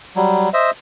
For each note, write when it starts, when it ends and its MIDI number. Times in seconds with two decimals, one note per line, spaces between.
0.16 0.49 54
0.16 0.49 55
0.54 0.71 72
0.54 0.71 75
0.54 0.71 76